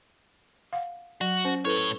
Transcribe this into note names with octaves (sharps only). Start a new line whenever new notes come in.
F5 F#5
F#3 F#4
C#4 C5
A2 E4 A4 B4 C#5